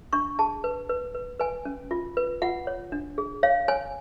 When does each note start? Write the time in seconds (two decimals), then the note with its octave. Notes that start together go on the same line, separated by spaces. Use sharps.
0.13 D4 C#6
0.39 G#4 A5
0.64 B4
0.89 B4
1.15 B4
1.39 B4 G#5
1.65 C#4
1.91 F4
2.17 B4
2.42 F4 F#5
2.67 C#5
2.92 D4
3.18 G#4
3.43 C#5 F5
3.68 C#5 G#5